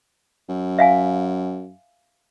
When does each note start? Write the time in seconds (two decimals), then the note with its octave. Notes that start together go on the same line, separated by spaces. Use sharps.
0.49 F#2
0.79 E5 F5 G#5